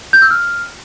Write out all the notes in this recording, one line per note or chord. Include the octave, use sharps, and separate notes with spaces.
G6
E6
F6